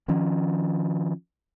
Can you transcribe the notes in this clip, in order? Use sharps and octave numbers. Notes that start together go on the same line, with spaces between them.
D#3 F3 C#4